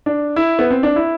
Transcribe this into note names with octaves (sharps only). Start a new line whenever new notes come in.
D4
E4
B3
C4
D4
E4